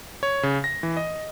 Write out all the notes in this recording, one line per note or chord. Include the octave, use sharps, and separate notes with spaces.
C#5
C#3
A#6
E3
D#5